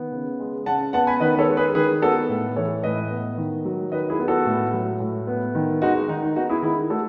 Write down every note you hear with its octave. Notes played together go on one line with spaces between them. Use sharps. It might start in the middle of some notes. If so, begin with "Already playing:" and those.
Already playing: D#3 B3
C#3
G#3
C#3 F#5 A5
B3 F#5 A5
G#5 B5
D#3 B4 D#5
B4
A4 C#5
G#3
G#4 B4
D#3 G#4 B4
B3 F#4 A4
A2
E3 A4 C#5
A2 B4 D#5
B3
D#3
F#3
D#3 B4 D#5
E4 G#4
B3
F#4 A4
A2
F#3
A2
B3
D#3
G#3 D#4 F#4
D#3 D#4
D#4
B3 D#4 F#4
E4 G#4
D#3 E4 G#4
A3 F#4 A4